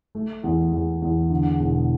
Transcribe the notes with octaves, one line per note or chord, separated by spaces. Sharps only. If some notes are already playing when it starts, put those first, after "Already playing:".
A3
E2
E2
E2
D3
E1